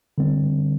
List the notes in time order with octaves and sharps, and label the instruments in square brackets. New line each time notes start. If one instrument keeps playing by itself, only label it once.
[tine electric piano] D3 G3 C4